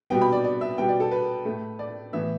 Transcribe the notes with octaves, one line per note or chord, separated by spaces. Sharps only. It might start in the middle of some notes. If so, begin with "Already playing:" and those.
B2 G3 B3 G5
B5
D5
D5
E5
B2 G3 B3 G5
D5
A4
B4
A2 A3
D5
A2 E3 B3 E5